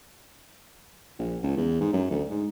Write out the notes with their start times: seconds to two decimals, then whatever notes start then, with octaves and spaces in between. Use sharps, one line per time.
1.19 A#1
1.43 C#2
1.57 E2
1.81 G#2
1.93 F#2
2.11 D2
2.30 G#2